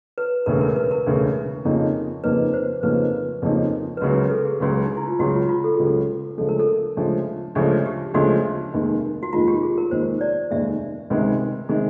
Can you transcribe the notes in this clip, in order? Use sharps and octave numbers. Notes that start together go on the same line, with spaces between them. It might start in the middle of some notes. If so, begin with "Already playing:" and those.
B4
E1 D2 C#3 A#4
A#4
B4
A#4
E1 D2 C#3
F2 C#3 F3 A#3 D#4
F2 C#3 F3 A#3 D#4 B4
C5
F2 C#3 F3 A#3 D#4 B4
F2 C#3 F3 A#3 D#4
B4
C#2 C#3 F#3 A#4
A4
G#4
C#2 C#3 F#3
D#4
E4
F4
C#2 C#3 F#3 F#4
F4
F4
A4
C#2 C#3 F#3 G#4
A4
D2 C#3 F3 G#3 A4
A#4
A4
D2 C#3 F3 G#3
D2 C#3 F3 G#3 G#4
G4
D2 C#3 F3 G#3 F#4
F1 D#2 D#3 G#3
F#4
F1 D#2 D#3 G#3 F4
G4
G#4
A#4
F1 D#2 D#3 G#3 C5
D5
F1 D#2 D#3 G#3 E5
C#2 C3 D#3 G#3
C3 D#3 G#3